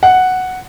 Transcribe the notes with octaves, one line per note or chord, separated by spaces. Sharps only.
F#5